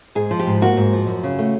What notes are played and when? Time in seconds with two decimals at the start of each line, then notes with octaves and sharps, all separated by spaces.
0.15 G#2 G#4
0.31 F3
0.40 G4
0.47 G#2
0.62 A#3 F#4
0.77 G#2
0.92 F3
1.07 F#2
1.23 C#3
1.39 A3